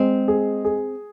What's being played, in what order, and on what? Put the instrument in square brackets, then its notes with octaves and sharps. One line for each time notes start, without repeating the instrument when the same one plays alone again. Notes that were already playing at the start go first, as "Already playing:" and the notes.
Already playing: [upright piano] G#3 [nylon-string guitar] C4
[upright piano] G#4
G#4